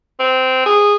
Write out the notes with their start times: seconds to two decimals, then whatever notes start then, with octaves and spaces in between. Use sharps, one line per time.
0.20 C4
0.66 G#4